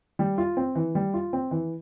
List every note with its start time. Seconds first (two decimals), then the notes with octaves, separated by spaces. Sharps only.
0.19 G3
0.38 F4
0.57 C4
0.75 E3
0.95 G3
1.14 F4
1.33 C4
1.51 E3